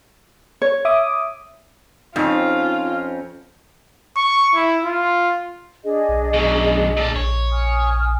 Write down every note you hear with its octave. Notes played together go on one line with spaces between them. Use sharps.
C#5
E5 D6 D#6
F2 C4 C#4 D#4 F4
C#6
E4
F4
D4 G#4 D#5
B1
F#2 B2
A#2 A4
A#1 C#5
G#5 D#6 F6